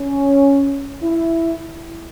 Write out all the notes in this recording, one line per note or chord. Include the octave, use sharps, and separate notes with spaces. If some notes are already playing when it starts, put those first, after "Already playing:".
Already playing: C#4
E4